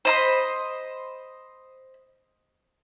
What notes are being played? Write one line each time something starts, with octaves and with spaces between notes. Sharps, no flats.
C5 D#5 B5